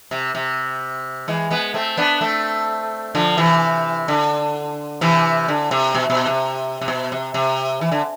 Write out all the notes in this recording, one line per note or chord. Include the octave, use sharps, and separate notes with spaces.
C3
C3
E3 G#3
G#3 B3
A3 C4
B3 D4
A3 C4
D3 F3
C3 E3
D3
C3 E3
D3
C3
B2
B2
C3
C3
B2
C3
C3
E3
D3